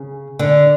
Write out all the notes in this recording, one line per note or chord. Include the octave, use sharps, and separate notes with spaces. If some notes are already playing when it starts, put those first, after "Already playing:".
Already playing: C#3
D3